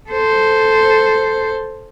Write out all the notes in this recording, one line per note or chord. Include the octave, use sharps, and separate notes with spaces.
A4 C5